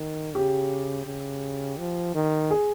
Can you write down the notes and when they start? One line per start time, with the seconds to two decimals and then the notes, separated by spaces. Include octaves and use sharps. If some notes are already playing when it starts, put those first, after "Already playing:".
Already playing: D#3
0.35 C#3 G4
1.06 C#3
1.79 F3
2.15 D#3
2.51 G#4